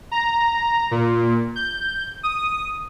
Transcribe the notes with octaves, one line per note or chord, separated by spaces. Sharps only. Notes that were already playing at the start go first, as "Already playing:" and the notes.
A#5
A#2
G6
D#6